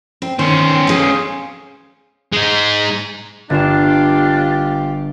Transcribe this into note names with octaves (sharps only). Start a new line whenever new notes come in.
C4
D#3 C#4 C5
G#4 F5
G#3 D#4
G1 D4 F4 G4 E7